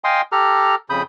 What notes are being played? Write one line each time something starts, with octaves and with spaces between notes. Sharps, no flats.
D#5 F5 G5 G#5 C6 D#6
G4 A4 A#5 F6
F2 C#3 B5 D#6 G6